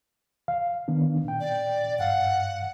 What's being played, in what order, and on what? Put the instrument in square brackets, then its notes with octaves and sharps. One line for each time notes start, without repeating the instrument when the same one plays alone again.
[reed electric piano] F5
D#3 B3 D4
A#2 G5
[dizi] D5
[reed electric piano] G2 F5 [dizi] F#5